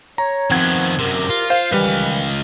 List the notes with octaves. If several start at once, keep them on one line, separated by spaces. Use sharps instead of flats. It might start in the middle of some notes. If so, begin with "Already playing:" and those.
C#5 A#5
D#3 F3 B3 C4 F#5 G#6
C2 F#2 C3 G4 A#4
F4
C5 F5
C#2 D#3 E3 G3 B4 F5